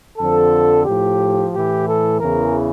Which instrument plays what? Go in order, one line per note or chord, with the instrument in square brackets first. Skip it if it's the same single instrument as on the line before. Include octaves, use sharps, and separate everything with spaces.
[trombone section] F2 D3 F3 A4
A2 F3 G4
A2 E3 G4
A4
E2 C#3 E3 A#4